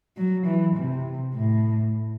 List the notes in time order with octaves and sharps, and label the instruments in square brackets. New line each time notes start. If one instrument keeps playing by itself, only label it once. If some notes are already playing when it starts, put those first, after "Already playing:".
[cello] F#3
E3
C3
A2